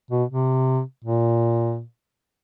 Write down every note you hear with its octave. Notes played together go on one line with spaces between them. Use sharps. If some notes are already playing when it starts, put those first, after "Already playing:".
B2
C3
A#2